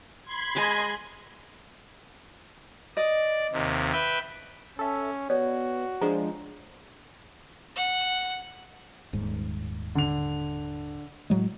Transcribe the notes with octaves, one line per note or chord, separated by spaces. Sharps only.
B5 C6 G#6
G#3 D#5 G#5 A5 C#6
D5 D#5
D#2 C3
B4 E5 G5
C#4 A4 E5
B3 F#4 C#5 D5
F3 G#3 D4 A#5
F#5
D#1 G#2
D3 F7
A2 F#3 G#3